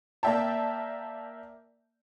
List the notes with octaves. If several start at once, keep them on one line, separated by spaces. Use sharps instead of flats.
A#3 D5 E5 G5 A5